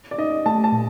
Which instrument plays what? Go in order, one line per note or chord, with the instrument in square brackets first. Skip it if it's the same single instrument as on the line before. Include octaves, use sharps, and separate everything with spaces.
[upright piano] D5
[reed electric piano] D#4 [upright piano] D#5
[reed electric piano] A3 [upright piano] A5
[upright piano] A5
[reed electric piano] A#2